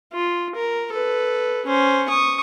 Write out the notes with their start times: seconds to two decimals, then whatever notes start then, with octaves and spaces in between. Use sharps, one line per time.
0.13 F4
0.55 A#4
0.92 A4 B4
1.66 C#4 C5
2.09 C#6 D#6